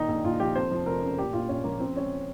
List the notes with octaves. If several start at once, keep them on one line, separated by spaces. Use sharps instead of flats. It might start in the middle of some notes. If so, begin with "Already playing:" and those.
Already playing: A#2 D#3 D#4
A#1
A#1 F4
F3 G4
F2 C5
F3
F1 A#4
C#3
A#2 G4
A#1 F4
A#1 C#4
F3 A#3
C#3 C4
C#2 C#4